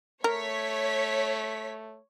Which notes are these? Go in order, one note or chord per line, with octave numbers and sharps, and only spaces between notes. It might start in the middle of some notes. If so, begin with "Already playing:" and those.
A3 A#4 C#5 B6